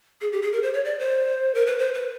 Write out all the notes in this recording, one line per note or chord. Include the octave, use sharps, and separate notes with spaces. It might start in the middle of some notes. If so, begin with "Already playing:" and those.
G#4
G4
G#4
A#4
C5
C#5
D5
C5
A#4
B4
C5
B4